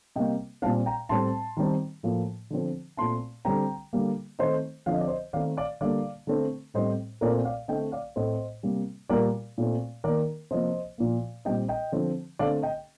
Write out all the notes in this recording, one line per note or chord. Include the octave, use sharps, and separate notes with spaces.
C3 G3 A#3 D#5 G5
A#2 G3 C4 F5 A5
G5 A#5
A2 G3 C4 A5 C6
D#3 G3 C4
A2 F3 A#3
D3 F3 C4
A#2 A3 C4 A5 C6
D3 G3 C4 G5 A#5
D3 G3 A#3
D#3 A3 C4 C5 D#5
D3 F3 C4 F5
D#5
D5
C5 D#5
D#3 A3 C4 D5 F5
D5 F5
D3 G3 A#3 D5 F5
D3 A3 C4
A2 G3 C4 C5 D#5
A#2 A3 C4 A#4 D5
D5 F5
D3 A3 C4 D#5 G5
D5 F5
A2 A3 C4 C5 D#5
C3 G3 A#3
A#2 G3 A#3 A#4 D5
A#2 A3 C4
D#3 A#3 A#4 D5
C3 F3 A#3 C5 D#5
A#2 F3 A#3
A#2 G3 C4 D#5 G5
D#5 G5
D3 F3 C4
D3 A3 C4 D5 F5
D#5 G5